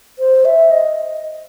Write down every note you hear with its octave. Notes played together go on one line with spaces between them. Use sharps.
C5
E5
D#5